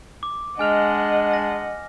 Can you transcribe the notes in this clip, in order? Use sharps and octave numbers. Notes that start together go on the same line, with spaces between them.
D6
G#3 D4 D#5 F#5 G#5 F6 F7
A#6